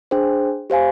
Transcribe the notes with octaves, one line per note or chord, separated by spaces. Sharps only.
D4 G#4 C5 G5
G4 C5 F5 G#5